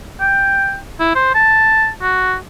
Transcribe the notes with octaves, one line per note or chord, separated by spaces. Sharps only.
G5
E4
C5
A5
F#4